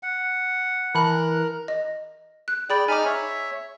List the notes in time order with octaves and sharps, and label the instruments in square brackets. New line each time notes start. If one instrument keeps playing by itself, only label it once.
[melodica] F#5
[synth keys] E3 F#6 [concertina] A#4 [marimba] A5 B5
[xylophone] D#5
F#6
[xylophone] G#4 B5 A6 [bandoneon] D5 G5
[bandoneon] D#4 B5 F6 [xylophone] G#5 D6
[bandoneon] C#5 E5